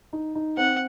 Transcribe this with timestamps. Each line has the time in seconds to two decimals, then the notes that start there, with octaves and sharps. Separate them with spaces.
0.13 D#4
0.35 D#4
0.57 C4 F#5